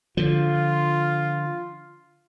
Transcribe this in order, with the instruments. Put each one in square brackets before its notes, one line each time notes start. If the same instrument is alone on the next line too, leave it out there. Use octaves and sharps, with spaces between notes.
[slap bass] D3 F3 [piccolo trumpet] F4